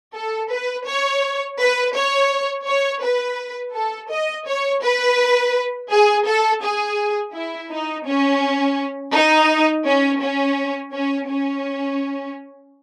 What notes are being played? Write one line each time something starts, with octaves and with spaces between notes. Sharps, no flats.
A4
B4
C#5
B4
C#5
C#5
B4
A4
D#5
C#5
B4
G#4
A4
G#4
E4
D#4
C#4
D#4
C#4
C#4
C#4
C#4